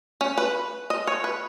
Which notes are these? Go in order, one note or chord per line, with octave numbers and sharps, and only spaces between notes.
C#4
B4
D#5
C#5
B4